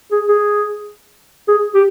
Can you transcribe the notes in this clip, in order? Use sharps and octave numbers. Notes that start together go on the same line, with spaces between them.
G#4
G#4
G#4
G4